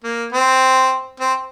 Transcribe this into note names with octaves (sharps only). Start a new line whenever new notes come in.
A#3
C4
C4